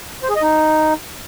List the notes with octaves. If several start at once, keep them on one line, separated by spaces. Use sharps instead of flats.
C5
G#4
D#5
D#4